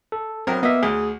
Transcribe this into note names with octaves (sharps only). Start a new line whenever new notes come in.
A4
B1 C4 A#4
A#3 B3 D#5 E5
D2 G#4